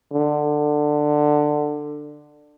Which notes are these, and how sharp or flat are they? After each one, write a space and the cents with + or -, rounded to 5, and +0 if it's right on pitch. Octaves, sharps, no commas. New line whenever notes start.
D3 +15